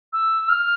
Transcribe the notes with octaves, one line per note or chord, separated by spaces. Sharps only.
E6
F6